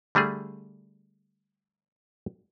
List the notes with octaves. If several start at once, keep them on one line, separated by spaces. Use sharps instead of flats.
D3 G3 A3 G#4